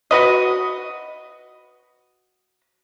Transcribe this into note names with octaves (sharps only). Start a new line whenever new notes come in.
F#4 B4 D#5